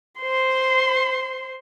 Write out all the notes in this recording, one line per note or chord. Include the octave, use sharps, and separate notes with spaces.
C5 C6